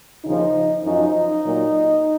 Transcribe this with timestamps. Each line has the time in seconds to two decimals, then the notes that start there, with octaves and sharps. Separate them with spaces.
0.24 D#2 C#3 F3 D#4
0.83 F#2 F3 D#4
1.43 A#2 F#3